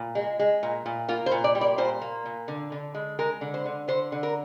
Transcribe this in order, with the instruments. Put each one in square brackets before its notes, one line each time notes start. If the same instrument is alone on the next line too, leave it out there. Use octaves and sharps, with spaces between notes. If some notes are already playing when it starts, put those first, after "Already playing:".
Already playing: [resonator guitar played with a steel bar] A#2
G#3
G#3
A#2
A#2
A#3 F4
C5
A#2
D5
G3
D5
A#2 C5
A#3
A#2
D3
D3
G#3
G#3 A#4
D3
C5
D3
D3 C5
D3
A#4